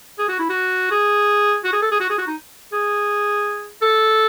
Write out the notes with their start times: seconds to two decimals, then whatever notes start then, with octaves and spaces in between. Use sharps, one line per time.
0.19 G#4
0.29 F#4
0.40 E4
0.50 F#4
0.91 G#4
1.64 F#4
1.73 G#4
1.82 A4
1.92 G#4
2.00 F#4
2.10 G#4
2.19 F#4
2.27 D#4
2.73 G#4
3.82 A4